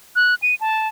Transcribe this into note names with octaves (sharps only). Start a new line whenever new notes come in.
F#6
D#7
A5